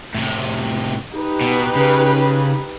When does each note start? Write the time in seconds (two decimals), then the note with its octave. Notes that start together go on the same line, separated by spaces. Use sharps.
0.14 A2 C3
1.11 D#4 G4 B4
1.41 B2
1.76 C#3